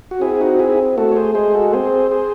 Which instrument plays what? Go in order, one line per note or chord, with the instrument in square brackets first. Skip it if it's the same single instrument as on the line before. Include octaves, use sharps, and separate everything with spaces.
[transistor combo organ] F#4
[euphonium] C4 [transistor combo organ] E4 G#4
[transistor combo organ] D#4 F#4
E4 G#4
[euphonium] A3 [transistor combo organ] F#4 A4
[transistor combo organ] C#5
G#4 C5
[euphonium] G#3 [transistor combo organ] G#4 C5
[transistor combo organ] F#4 A4
[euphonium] C4 [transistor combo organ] G#4 C5
[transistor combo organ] G#4 C5